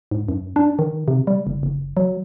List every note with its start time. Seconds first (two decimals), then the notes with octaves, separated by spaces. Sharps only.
0.11 G#2
0.29 F#2
0.56 D4
0.79 D#3
1.08 C3
1.27 G3
1.47 F#1
1.63 F#1
1.97 F#3